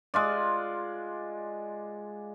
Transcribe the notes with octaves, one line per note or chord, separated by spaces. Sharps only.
G#3 F4 D5